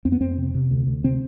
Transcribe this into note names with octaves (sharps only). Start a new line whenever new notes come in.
F2 C4
B3
F2 C4
C3
C3
D2
D2
C3 C4